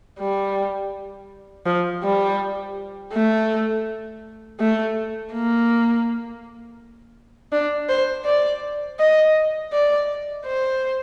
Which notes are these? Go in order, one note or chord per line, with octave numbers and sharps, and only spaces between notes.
G3
F3
G3
A3
A3
A#3
D4
C5
D5
D#5
D5
C5